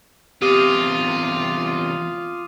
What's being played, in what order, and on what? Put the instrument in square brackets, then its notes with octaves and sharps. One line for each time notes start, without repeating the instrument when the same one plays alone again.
[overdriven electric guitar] E2 C3 [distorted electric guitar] F4 [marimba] G4 [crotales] D6 D#6 D#7